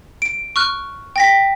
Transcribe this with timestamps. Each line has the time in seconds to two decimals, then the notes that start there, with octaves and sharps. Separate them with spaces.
0.22 D7
0.56 C#6 F6 F#6
1.16 G5 A#6 B6